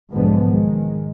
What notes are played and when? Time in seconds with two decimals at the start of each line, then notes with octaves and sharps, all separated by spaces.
0.13 B1 G#2 D3 F3 G#3 B3
0.48 D#3 G#3